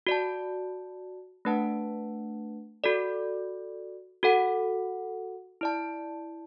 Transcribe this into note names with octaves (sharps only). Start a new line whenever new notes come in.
F#4 D5 A5
A3 D4 B4 F#5 A5
F#4 A4 D5
F#4 A4 F#5
E4 D5 A5